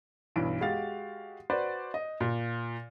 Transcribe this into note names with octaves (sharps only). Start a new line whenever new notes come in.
B1 G2 E3 D7
G#3 F#4 G4 F5 A6
F#4 B4 C5 D5
D#5
A#2